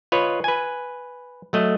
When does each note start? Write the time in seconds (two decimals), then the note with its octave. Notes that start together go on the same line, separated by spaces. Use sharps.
0.12 F4 B4 C#5 D#5
0.44 B4 G#5
1.53 F#3 A3 D#5